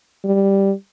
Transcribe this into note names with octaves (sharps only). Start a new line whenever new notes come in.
G3